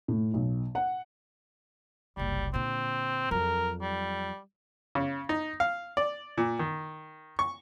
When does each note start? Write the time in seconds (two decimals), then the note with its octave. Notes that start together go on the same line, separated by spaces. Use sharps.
0.08 A2
0.34 B1
0.75 F#5
2.17 F#1 C2 G3
2.54 A#2 D3 C4
3.31 F2 F#3 A#4
3.82 G3
4.95 C#3
5.29 D#4
5.60 F5
5.97 D5
6.38 A#2
6.59 D#3
7.39 C#6